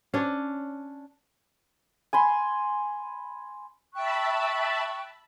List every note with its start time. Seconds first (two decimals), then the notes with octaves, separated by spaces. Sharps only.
0.14 C#4 D4
2.13 G#5 B5 C6
3.94 E5 G5 A5 B5 C#6 F#6